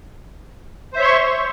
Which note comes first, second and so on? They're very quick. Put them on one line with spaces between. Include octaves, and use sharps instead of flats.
C5 E5 C#5 C6 C#6